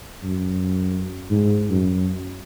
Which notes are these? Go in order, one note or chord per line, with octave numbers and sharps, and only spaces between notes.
F#2
G#2
F#2